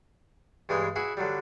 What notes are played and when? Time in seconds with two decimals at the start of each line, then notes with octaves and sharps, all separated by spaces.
0.69 G2 E3 G#3 G#4 G5
0.96 E4 F#4 G#4
1.17 D3 F#3 G3